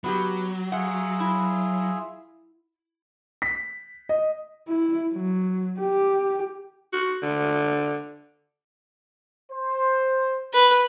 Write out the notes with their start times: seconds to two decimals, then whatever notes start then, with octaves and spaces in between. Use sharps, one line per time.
0.04 F#3 B3 F#4 G4
0.72 F4 G#4 E5 F#5
1.20 E4
3.42 B6
4.09 D#5
4.68 E4
5.13 F#3
5.80 G4
6.93 F#4
7.22 D3
9.50 C5
10.54 B4